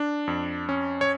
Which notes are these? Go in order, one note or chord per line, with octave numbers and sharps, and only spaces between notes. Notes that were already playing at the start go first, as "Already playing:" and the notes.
Already playing: D4
F2
C#4
C#5